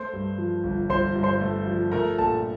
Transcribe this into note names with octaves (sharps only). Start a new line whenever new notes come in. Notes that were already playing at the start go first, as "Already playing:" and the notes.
Already playing: A3 C5 C6
G2
F3
G1
G1 C5 C6
G2
C5 C6
A3
F3
A3 A#4 A#5
A#1 A4 A5